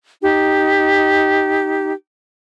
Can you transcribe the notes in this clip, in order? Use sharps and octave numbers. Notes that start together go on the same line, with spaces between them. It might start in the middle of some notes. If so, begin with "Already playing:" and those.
D#4 G4